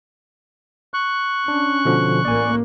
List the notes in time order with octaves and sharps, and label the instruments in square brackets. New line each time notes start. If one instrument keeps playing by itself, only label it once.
[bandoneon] C#6 F#6
[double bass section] C#4 [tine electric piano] D4
[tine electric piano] B2 D3 F3
[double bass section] A1 A#3 [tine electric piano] D5 G#5